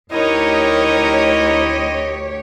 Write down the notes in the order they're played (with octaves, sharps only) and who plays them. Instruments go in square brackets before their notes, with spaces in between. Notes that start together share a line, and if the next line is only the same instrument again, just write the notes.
[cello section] D2 G4 C#5 [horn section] C4 D#5 [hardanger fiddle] D#4 A#4 [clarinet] E4